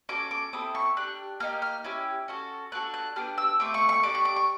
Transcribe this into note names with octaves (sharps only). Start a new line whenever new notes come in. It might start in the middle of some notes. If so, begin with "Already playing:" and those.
C#4 F#4 A4 D6
D6
C4 E4 A4 D#6
C#6
D4 G4 F#6
A#3 D#4 G4 F6
F6
C#4 E4 G4
C#4 F#4 A4
B3 D4 F#4 A4 F#6
F#6
B3 D4 G4 F6
E6
A3 C4 D6
C#6
C#6
D4 G4 D6
C#6
D6
C#6